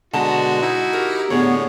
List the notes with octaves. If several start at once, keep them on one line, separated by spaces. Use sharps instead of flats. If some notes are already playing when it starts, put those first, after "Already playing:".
B2 D3 G#3 F#4 A5 A#5
D#4 E4
G4 A#4
A2 D3 B3 G#4 C#5